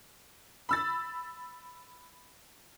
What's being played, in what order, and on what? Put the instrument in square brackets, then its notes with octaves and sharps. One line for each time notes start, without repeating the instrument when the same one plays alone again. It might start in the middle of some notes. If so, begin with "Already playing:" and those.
[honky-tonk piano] B5 E6 A6